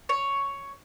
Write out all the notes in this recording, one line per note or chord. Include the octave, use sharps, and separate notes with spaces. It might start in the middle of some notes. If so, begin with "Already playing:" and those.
C#5